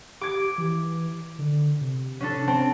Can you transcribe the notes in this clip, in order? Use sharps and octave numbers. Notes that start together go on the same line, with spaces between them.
G4 D6 G#6 D7
E3
D3
C3
C#4 D4 A4
C4 A5